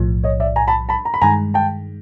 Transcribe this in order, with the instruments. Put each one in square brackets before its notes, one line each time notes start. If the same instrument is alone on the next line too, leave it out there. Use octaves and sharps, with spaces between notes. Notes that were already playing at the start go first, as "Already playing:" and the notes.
Already playing: [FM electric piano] B1 A2 F3
[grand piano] C#5 D#5
D5 E5
G#5 A#5
A5 B5
A5 B5
A#5
B5
[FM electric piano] G2 D#3 G#3 [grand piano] G#5 A#5
[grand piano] G5 A5